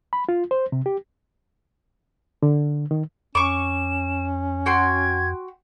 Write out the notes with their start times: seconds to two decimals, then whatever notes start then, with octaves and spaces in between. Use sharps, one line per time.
0.13 B5
0.29 F4
0.51 C5
0.72 C3
0.86 G4
2.43 D3
2.91 D#3
3.35 F2 C#4 C#6 D6 E7
4.66 F#4 G5 C6 G#6